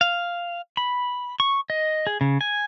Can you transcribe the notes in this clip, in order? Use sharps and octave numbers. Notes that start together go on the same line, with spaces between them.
F5
B5
C#6
D#5
G#4
C#3
G#5